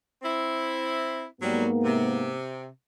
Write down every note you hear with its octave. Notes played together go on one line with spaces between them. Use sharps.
C4 E4
G#2 F#3 G3 A#3 B3
C3